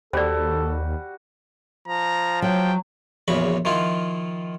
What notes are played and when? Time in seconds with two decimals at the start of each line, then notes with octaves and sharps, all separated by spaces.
0.13 D#2 G3 F#4 G4 A4 C5 D5
1.88 F3 A#5
2.42 F#3 G5
3.28 A#1 E2 C#3 F#4 B5 C#6
3.65 D#3 F3 E4 F4